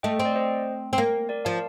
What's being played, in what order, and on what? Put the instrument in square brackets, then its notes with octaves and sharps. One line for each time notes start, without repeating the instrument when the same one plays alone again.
[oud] A3 [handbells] D#5 G5
[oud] C4
[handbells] D5
C5 D#5
[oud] C4
A#3
[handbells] A#4 D5
[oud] F3 [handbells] F5 A5